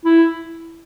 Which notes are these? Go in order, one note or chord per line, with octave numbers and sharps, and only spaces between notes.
E4